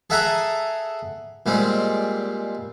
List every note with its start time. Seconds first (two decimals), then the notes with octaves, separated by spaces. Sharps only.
0.10 G#4 A4 E5 F#5 G#5 A#5
1.46 A#2 G3 G#3 C4